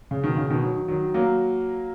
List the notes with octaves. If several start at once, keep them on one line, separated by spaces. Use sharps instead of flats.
C#3
B2 D#3
C#3
B2 D#3
D#3 F#3
D#3 F#3
F#3 A#3